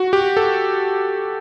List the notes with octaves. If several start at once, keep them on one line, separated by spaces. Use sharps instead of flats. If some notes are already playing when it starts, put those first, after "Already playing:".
Already playing: F#4
G4
A4